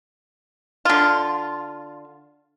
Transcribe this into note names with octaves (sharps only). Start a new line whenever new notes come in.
D3 F4